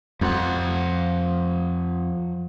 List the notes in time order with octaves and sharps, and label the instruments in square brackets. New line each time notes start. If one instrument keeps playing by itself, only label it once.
[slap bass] F2 [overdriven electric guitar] F3 F#5